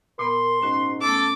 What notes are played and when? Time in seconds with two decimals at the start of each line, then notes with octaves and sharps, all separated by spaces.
0.19 A#2 B3 A#4 B5 C6
0.62 G#2 C#4 F#4
1.02 A3 B3 C#4 A4 D6